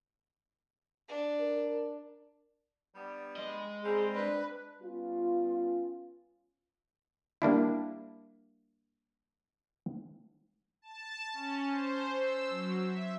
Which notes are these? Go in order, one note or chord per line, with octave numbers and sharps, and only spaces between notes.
D4
A#4
G3 B3 D4
G#3 D#5
G3 C4 G#4 A#5
D4 B4
G3 B3 C#4 F4
G3 A#3 D4 E4
A5
C#4
C5
E6
F#3
E5